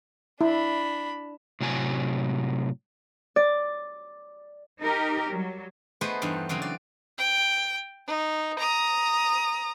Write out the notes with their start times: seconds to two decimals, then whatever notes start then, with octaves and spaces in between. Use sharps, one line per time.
0.41 D4 E4 B5
1.61 A2 C3 F#3 G4 G#5
3.36 D5
4.81 D#4 G4 A#4 D#5
5.32 F#3 G3
6.01 A3 B3 G#4 B4 C5 D#5
6.22 E2 G2 D#4
6.49 C#3 E3 F#3 C4
6.62 D5
7.18 G5
8.07 D#4
8.59 A#5 D#6